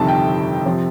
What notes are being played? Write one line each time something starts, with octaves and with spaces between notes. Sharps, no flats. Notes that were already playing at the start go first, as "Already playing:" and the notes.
Already playing: G1 F2 C3 D#3 A5
G5
F2 C3 F3